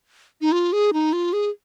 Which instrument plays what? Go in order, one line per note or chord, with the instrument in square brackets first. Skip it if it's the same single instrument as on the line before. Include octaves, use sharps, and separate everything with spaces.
[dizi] D#4
F4
G#4
D#4
F4
G#4